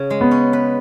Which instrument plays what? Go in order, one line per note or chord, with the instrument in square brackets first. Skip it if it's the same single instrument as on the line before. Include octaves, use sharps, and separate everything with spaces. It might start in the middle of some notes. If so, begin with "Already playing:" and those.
Already playing: [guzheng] C#3
G#3
[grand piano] B3
[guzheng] C#4
B4